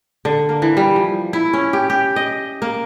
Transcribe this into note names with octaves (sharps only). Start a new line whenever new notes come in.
D3
A#3
E3
G3
F3
E4
C#4
G4
G4
D#5
A#3